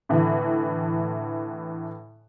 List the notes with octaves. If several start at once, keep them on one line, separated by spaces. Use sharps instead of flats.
A2 D3 E3